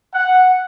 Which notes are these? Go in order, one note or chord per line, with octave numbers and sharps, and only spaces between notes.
F#5